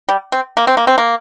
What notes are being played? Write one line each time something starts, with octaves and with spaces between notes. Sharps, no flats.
G3
C4
A#3
C4
A#3
C4
A#3